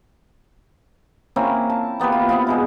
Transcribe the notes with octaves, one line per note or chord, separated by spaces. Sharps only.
A#3 C4 C#4 E4
A5
A#3 B3 G4 B4
F4
B3 C4 F4
B2 G#3 E4